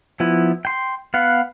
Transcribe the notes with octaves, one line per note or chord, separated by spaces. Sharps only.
F3 B3 E4
G5 C6
B3 F5 F#5